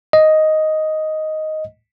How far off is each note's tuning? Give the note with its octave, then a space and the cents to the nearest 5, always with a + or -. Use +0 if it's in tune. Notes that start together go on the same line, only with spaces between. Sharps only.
D#5 +5